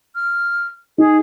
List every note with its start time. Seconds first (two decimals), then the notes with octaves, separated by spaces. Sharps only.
0.15 F6
0.98 D#4 G#4